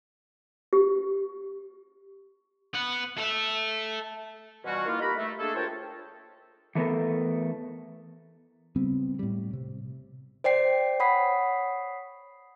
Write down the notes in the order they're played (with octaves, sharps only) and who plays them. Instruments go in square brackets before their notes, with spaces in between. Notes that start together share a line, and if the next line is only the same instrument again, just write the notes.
[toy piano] G4
[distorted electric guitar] B3 F#5
A4 E5
[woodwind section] B2 E3 G3 C#4 F4 F#4
D#3 A#3 E4 F4
D#4 G4 A#4 F#5 A#5 B5
A3
G#3 A#3 D4 G#4 A4
D2 F4 A#4 C#5 G5 A5
[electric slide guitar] E3 A3 B3 A4 A#4
[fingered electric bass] C#3 G3 B3 C4
A2 G3
C3
[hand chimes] C5 D5 G5 C7
C#5 F#5 B5 D#6 B6 C7